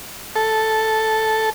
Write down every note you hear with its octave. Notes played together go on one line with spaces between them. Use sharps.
A4